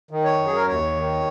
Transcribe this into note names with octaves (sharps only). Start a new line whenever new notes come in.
D#3
C#5
F#2
G#4
A#4
D#2 C#5
D#3